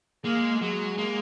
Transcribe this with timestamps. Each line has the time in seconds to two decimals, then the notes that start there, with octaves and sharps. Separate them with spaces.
0.24 G#3 A#3
0.61 F#3 G#3
0.98 A#3